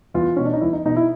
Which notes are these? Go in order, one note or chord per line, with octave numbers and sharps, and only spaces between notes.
E2 F4
B2 C#4
D4
D#4
E2 E4
D#4
B2 D#4
E4